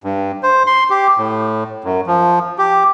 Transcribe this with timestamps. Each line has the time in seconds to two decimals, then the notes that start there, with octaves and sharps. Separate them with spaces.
0.04 G2
0.43 C5
0.67 C6
0.90 G4
1.18 A2
1.84 F#2
2.07 F3
2.58 G4